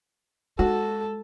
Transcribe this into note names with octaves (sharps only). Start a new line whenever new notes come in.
G#3 F#4 A4